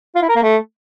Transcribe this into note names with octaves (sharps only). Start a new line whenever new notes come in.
F4
E4
A#4
A#3
A3